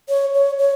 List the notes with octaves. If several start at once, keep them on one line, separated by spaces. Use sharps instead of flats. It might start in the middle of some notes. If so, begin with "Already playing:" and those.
C#5
C#5
C#5